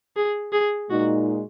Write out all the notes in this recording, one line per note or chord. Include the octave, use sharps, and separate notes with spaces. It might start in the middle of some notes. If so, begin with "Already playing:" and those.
G#4
G#4
A#2 G#3 D#4 F#4